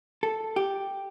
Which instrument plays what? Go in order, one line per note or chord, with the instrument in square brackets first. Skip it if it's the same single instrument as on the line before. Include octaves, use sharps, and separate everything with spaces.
[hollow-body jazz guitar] A4
G4